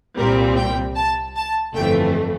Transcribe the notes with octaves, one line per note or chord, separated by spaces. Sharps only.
C2 A#2 G3 C4 A#4
G5
A5
A5
G1 F2 E3 A3 G5